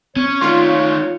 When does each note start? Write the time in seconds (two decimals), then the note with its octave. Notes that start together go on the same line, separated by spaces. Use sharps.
0.16 C4 C#4 C#5
0.41 D#3 A3 F4